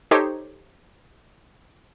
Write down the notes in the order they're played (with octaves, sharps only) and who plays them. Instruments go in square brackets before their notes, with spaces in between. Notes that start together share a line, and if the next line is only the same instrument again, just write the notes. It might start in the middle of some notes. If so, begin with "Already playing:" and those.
[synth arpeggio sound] D#4 G4 A4 C5 C#5